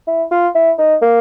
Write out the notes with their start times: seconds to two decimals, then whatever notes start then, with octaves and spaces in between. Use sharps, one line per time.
0.07 E4
0.31 F4
0.55 E4
0.78 D#4
1.02 A#3